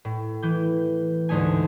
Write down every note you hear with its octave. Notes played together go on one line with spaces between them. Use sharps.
A2
E3 G6
D2 G#2 D3 A3 D#4 G#5